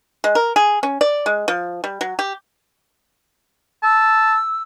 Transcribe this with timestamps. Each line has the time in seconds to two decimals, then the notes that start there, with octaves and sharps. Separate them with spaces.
0.24 G#3
0.35 A#4
0.56 G#4
0.83 C#4
1.01 D5
1.26 G#3
1.48 F3
1.84 G3
2.01 F#3
2.19 G4
3.83 A5 E6